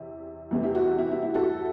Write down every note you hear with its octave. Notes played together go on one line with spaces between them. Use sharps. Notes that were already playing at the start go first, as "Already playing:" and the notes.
Already playing: E2 C3 E4
E2 C3 E3 A3
E4 G4
F#4
F#4
E4
E4
E4
F#4 A4